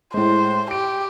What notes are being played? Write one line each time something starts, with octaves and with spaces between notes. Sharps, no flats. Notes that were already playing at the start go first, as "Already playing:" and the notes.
A2 G#3 C5
G4 D7